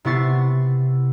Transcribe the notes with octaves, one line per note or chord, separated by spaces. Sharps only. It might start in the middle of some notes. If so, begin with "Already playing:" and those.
C3 B3 E4 C#6 A6 C7